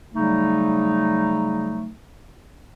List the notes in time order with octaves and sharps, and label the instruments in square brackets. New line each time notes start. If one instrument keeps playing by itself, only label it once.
[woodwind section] C#3 F#3 G3 A3 D#4